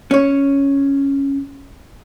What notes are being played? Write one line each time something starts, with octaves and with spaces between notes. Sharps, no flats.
C#4 C#5